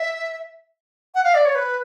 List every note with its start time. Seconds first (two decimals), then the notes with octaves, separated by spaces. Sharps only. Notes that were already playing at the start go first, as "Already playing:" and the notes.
Already playing: E5
1.15 F#5
1.24 F5
1.34 D5
1.45 C#5
1.55 B4